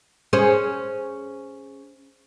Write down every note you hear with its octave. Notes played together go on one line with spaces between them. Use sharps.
C#4 G#4 C5